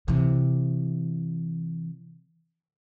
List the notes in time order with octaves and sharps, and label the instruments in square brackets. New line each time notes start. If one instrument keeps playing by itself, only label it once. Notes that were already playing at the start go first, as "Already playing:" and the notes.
[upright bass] C3 E3